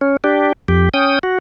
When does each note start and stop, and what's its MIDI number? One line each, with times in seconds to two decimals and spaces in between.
0.01 0.17 61
0.24 0.53 62
0.24 0.53 67
0.68 0.89 41
0.68 0.89 67
0.94 1.19 61
0.94 1.19 79
0.94 1.19 87
1.23 1.38 66